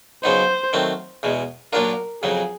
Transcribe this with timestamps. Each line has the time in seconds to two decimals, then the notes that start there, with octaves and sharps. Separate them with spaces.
0.24 C#3 F#3 B3 D#4 C5
0.73 D#3 F#3 A3 C4
1.23 E2 B2 G#3
1.73 A#2 F#3 A#3 D4 F4 A#4
2.23 F2 C#3 F#3 G#4